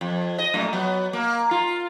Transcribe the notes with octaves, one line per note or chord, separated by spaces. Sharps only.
F2
D#5
F#2 A#2 A3
F#3 B3
A#3
F4